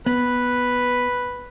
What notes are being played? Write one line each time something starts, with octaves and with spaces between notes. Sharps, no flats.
B3 B4